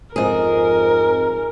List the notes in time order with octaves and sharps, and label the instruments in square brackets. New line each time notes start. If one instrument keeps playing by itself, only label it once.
[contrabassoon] F2 [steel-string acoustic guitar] G#2 G#4 [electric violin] A#4